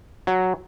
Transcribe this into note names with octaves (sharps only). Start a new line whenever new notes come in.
F#3